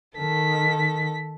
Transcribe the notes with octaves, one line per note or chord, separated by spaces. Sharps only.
D#3 A4 B6